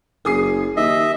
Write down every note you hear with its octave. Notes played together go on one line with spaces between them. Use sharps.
F#1 G#4 D#6 C7
D#2 D#5 E5